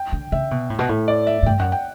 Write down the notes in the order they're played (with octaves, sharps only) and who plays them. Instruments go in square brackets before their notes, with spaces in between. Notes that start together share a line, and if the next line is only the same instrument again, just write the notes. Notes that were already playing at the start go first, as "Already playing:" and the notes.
Already playing: [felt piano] G5
[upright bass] D3
[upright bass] C#3 [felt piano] E5
[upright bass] B2
A2
B2
A2
[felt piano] D5
E5
[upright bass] A2
[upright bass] G2 [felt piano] G5
[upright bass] F#2 [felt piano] F#5
[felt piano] G5